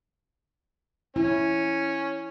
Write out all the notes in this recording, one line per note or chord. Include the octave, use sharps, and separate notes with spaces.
C#4 E4